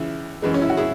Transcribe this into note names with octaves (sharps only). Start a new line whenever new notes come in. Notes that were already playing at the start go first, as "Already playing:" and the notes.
Already playing: C#2 C#3 E3 E4
F#2 E3 G#3
C#4
E4
F#4
E4 G#4